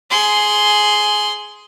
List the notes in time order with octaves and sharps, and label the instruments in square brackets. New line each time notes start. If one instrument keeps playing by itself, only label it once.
[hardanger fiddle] G#4 C6